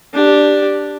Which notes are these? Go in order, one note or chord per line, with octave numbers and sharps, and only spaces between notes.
D4 G4